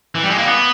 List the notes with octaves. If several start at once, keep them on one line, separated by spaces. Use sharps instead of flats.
E3
G3
G#3
A#3
B3